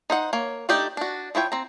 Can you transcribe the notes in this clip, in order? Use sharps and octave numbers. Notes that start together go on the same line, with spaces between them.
D#4 C5 F#5
A#3 C#5
A3 D4 D#4 G4 D5
D4 F#4
F3 E4 C#5 G5
C4 A#5